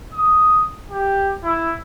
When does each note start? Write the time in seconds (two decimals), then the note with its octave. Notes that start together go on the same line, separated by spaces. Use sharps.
0.14 D#6
0.90 G4
1.44 E4